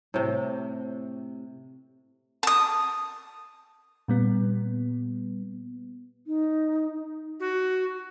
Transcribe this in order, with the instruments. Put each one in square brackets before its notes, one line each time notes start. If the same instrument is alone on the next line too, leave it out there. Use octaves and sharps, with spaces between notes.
[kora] A2 C3
[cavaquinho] A5 D#6
[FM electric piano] A#2 G3 B3
[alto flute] D#4
[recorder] F#4